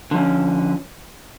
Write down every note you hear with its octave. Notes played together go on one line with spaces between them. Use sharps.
D3 F3 C#4